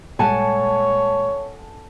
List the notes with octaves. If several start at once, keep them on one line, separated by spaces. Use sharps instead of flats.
A#2 G3 G#3 A4 C#5 F#5 G#5 A5